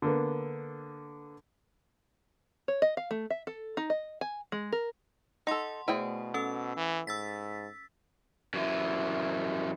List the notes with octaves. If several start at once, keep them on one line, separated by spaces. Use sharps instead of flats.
D3 A#3 B3
C#5
D#5
F5
A3
E5
A4
D#4
D#5
G#5
G#3
A#4
D#4 A4 F#5 C6
B2 A3 E4 G#4 C5 G5
C#4 A4 E6
E3
G#2 E6 A6 B6
F#2 E3